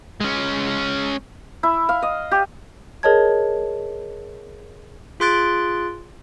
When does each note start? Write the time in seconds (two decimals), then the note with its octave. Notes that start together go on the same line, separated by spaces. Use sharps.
0.21 G#3 C#4
1.63 E4
1.89 F5
2.02 D#5
2.31 G4
3.03 G#4 A#4 C#5 D#5 A5 G#6
5.20 F4 G#4 C6 F#6 A6 D7